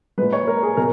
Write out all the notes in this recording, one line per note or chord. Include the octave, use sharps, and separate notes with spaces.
A#2 G#3 B4
C#5
A#4
G#4
B2 A#4